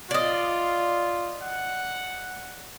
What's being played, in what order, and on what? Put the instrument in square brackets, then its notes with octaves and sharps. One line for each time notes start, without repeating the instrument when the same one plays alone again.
[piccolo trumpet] F4 [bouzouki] D5 D#5
[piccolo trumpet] F#5